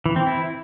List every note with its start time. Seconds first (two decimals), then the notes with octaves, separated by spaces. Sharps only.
0.06 E3
0.16 C4
0.26 E4